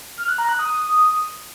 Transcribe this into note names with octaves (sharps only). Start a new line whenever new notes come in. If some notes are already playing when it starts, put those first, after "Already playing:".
F6
F#6
A#5
F#6
D#6